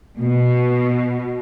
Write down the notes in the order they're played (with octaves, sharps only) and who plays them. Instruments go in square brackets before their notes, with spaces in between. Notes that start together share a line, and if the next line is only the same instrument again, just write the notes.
[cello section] B2